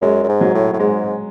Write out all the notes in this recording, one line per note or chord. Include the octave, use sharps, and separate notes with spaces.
F#2 G#3
F#2
G#2
F#3
A2
A2
G#2 G#3